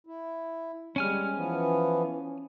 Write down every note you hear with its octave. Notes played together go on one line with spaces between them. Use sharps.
E4
G3 G#3 C#4 G#5 F6
E3 F3 B3